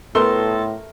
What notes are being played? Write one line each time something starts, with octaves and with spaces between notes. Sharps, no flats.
A2 A3 B3 A4 A#4 C6 G7